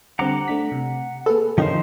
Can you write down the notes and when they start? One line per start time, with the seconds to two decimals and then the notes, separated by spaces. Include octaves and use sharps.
0.19 D3 G3 C4 F#5 A#5 D6
0.48 A3 D4 B6
0.72 C3
1.26 A#3 G#4 A4 B4
1.58 D#3 F3 C#4 D#4 C5 C#5